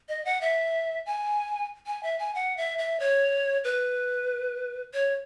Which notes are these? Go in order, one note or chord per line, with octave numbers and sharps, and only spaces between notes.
D#5
F#5
E5
G#5
G#5
E5
G#5
F#5
E5
E5
C#5
B4
C#5